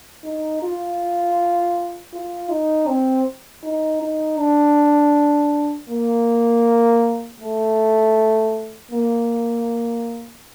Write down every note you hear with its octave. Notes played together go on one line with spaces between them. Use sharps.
D#4
F4
F4
D#4
C4
D#4
D#4
D4
A#3
A3
A#3